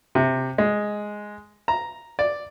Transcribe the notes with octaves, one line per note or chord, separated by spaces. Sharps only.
C3
G#3
A#5
D5